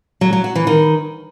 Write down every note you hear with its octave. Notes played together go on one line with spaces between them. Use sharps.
F#3
F#3
F#4
E3
D#3